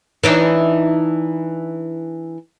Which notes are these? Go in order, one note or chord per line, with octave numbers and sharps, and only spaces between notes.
E3 D4 D#4